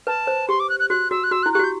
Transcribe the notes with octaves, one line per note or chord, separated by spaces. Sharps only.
B4 A5
C5
G4 C6
D6
F#6
F#6
F#4 F#6
F#4 E6
F#6
F#4 E6
F#6
E4
G4 F#6
F#4 G6